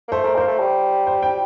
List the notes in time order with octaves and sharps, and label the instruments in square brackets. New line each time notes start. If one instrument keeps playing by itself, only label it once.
[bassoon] A#3
[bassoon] A3 [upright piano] C5
[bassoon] A3 [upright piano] A#4
[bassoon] A#3 [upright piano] C5
[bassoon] A3
G3
[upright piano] C5
G5